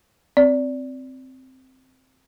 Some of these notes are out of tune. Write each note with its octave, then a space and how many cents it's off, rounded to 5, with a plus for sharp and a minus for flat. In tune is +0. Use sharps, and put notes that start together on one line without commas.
C4 -5 D5 -20